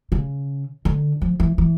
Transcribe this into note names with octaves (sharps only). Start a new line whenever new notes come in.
C#3
D3
F3
E3
E3